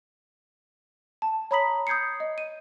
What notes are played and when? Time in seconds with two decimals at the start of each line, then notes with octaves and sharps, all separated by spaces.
1.22 A5
1.51 C#5 A#5 B5 D#6 B6 F#7
1.87 D#6 G6 G#6 C7 C#7
2.20 D#5
2.38 D#7